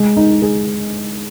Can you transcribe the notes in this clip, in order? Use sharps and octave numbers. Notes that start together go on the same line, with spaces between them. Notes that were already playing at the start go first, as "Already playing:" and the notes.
Already playing: G#3
D#4
G#4